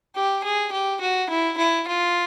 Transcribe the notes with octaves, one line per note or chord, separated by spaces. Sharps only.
G4
G#4
G4
F#4
E4
E4
F4